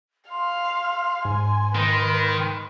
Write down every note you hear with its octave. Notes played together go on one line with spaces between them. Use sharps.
F5 C6
G#2 G#5
D#3 B4